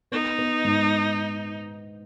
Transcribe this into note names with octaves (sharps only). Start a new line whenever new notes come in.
B3 D#4
B3
G#2